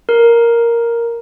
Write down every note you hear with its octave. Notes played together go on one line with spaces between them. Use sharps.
A#4